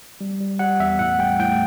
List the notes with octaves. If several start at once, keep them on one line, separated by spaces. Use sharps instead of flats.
G3
G3
G3 F#5
E2 E5
A2 F#5
G3 G5
A2 G5